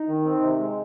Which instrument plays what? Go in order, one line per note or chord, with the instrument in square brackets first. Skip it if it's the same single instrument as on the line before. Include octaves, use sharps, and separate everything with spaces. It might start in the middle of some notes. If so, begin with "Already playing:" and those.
Already playing: [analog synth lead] D#4
[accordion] D#3
C4
C3
G#3